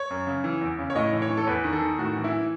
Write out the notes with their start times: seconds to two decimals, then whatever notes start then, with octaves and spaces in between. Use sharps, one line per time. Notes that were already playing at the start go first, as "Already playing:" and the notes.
Already playing: C#5
0.10 F#2
0.27 C#3
0.44 E3
0.61 E2
0.79 C#3
0.90 C#5
0.96 A2 D#5
1.12 E3
1.22 C#5
1.30 E3
1.37 A4
1.47 E2 B4
1.64 D#3
1.73 A4
1.81 D#3
1.99 A2 F#4
2.16 E3
2.24 E4
2.32 E3